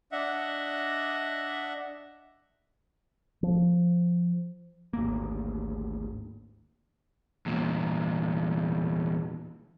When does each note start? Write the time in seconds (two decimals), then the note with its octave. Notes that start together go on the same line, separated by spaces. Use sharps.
0.12 D4 D#5 E5 F#5
3.43 F3
4.93 G#1 D2 A#3
7.46 E2 A#2